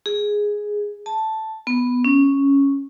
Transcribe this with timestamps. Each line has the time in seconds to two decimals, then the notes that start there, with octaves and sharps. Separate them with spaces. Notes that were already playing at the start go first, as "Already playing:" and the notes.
0.06 G#4
1.06 A5
1.67 B3
2.04 C#4